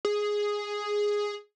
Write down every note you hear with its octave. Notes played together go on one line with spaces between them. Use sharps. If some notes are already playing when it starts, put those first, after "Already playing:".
G#4